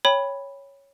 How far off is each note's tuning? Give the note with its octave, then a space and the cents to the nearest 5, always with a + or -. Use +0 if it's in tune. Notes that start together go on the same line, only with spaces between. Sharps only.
C#5 +0 G5 +25 B5 +0